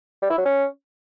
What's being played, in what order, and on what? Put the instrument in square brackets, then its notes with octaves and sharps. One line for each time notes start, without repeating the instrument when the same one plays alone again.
[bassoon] G3
E4
F#3
C#4